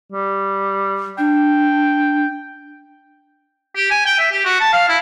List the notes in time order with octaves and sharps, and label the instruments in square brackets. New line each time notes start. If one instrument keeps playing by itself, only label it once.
[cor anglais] G3
[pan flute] D4 [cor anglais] G5
[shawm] G4
G#5
G5
E5
G4
F#4
A5
F5
E4